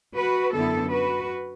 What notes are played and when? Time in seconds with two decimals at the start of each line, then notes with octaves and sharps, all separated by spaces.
0.16 F#4 B4
0.54 F#2 D3 B3 E4 A4
0.91 F#4 B4